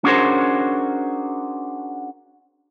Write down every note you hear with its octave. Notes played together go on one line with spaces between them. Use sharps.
C#4 D4 F#4 G#4 A#4 C5